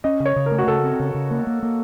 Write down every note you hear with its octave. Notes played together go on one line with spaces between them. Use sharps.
C#4 D#5
C#3
C#5
C#3
A#4
A3
F#4
C#3 A4
C4
C#3
C#3
A#3
A#3
A#3